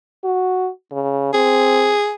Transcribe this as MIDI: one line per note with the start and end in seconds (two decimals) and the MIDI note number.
0.24 0.69 66
0.92 1.32 49
1.34 1.94 60
1.34 2.15 68